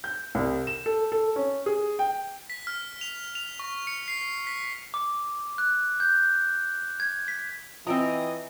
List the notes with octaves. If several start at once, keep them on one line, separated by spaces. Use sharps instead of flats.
G6
C2
E7
A4
A4
C#4
G#4
G5
B6
F6
F7
F7
C#6
C#7
C7
B6
D6
F#6
G6
G#6
B6
E3 C4 F4 D#5 G5 A#5